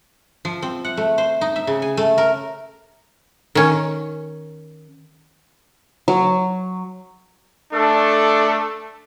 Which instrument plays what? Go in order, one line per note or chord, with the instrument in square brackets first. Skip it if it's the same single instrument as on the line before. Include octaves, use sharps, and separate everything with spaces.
[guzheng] F3
C4
F#5
A3
C5
D#4
E5
C#3
G#5
A3
A#4
[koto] D#3 C#4
[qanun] F#3
[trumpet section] A3 D4 A4